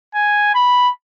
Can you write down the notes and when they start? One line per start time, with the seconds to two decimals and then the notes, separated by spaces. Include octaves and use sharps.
0.15 G#5
0.54 B5